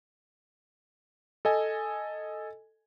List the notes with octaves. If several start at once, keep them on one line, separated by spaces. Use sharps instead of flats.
A4 D#5 G#5